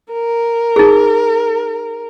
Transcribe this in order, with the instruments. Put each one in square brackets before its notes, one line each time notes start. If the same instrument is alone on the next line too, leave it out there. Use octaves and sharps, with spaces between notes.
[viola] A#4
[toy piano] D#4 G#4